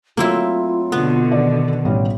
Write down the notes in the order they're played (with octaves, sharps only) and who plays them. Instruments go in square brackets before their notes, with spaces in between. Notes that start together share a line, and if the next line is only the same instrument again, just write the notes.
[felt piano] F#3 A3 [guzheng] A#3 C4 E4 [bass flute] F4
[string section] B2 D3 [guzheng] B3
[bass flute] D#3 [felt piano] D5
[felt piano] A1 G3 C#4